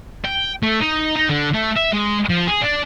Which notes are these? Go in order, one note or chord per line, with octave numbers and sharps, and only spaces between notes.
G5
A3
D#4
D#4
D3
A3
E5
G#3
F3
G#4
D4